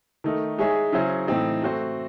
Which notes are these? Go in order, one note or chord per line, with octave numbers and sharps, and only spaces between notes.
D#3 A3 D#4
G#3 D#4 G#4 C#5 E5
C#3 F#3 C#4 E4 C5
A2 E3 C4 D#4
A3 C4 F#4 C5